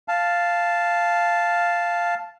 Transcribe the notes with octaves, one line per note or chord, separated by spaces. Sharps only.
F5 A5